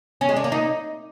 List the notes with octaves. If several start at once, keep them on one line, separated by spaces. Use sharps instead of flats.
C#4
G#3
D4
A#3
D#4